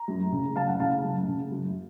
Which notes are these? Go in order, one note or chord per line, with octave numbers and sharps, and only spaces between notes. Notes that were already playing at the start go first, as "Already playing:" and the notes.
Already playing: A#5
F#2
C#3
F#2 F5 A5
F#5
C#3 F5 A5
F#2
C#3
F#2